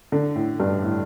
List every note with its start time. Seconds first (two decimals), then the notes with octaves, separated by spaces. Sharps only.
0.12 D3
0.36 A2
0.60 G2
0.84 A2